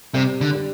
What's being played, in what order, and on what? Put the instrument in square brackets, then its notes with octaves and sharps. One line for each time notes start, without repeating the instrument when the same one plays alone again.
[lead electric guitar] C3 [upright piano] G3
[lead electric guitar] D3
[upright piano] G3